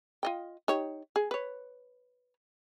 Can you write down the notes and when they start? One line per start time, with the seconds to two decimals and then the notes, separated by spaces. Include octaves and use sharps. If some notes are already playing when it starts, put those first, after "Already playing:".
0.23 F4 D#5 G5
0.68 D#4 G4 C#5
1.16 G#4
1.31 B4 C#5